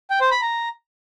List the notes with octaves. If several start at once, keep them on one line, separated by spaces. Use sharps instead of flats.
G5
C5
B5
A#5